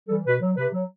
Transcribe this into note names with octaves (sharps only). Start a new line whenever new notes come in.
E3 G3 A4
B2 B4
F#3
C3 B4
F#3